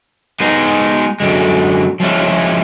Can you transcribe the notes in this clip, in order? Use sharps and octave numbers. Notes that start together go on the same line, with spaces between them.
G#3 B3 D#4 G#4
F#2 D3 G#3
F3 G#3 C#4 E4